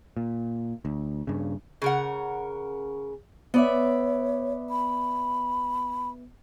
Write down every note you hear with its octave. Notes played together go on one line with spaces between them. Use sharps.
A#2
D2
G2 C#3
C#3 A#4 F#5
B3 C#5 D5 E5
B5